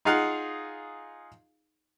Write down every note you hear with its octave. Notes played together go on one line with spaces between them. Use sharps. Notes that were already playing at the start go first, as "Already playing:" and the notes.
D#4 F4 G#4 F5 F#5